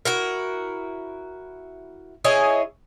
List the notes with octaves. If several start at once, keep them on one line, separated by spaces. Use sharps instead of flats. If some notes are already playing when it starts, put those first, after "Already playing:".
E4 F#4 A#4
E4 G#4 C#5 D#5